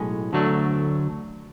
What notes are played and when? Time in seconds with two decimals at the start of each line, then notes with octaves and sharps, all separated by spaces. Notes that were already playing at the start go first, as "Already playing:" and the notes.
Already playing: B1 A2 G#3 C#4 G#4
0.33 D2 D3 F#3 A3 D4